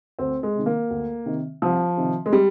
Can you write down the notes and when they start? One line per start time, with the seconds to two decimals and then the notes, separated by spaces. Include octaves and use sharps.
0.19 D2 C4
0.43 G#3
0.54 C3 D#3
0.66 A#3
0.90 D2
1.26 C3 D#3
1.62 C2 F3
1.97 C3 D#3
2.26 G#3
2.33 G3